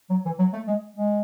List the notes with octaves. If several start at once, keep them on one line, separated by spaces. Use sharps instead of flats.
F#3
E3
F#3
A3
G#3
G#3